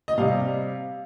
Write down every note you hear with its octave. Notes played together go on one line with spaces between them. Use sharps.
D#5
C3 G3 F5